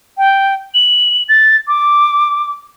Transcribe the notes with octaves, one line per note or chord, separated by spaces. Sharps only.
G5
F#7
A6
D6